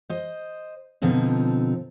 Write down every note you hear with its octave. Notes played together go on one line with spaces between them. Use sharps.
C5 D#5
B2 D3 F3 C4 D#4